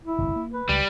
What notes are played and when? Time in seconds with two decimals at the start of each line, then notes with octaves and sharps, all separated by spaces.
0.05 E4
0.18 G1 C2 F2
0.36 A#3
0.53 B4
0.69 C#2 G3